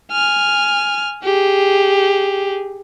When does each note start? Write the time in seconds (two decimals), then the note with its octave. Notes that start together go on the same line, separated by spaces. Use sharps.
0.12 G#5 F6
1.23 G4 G#4